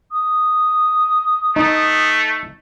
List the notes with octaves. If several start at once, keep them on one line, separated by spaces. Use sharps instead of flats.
D#6
A3 D#4